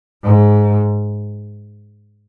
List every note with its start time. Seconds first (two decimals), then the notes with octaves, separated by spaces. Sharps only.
0.23 G#2